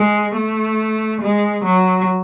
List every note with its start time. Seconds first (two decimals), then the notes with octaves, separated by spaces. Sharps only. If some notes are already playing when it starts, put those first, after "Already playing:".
Already playing: G#3
0.36 A3
1.22 G#3
1.65 F#3